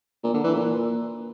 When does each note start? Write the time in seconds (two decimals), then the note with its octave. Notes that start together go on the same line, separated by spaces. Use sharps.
0.24 A#2
0.34 D3
0.44 E3
0.54 A#2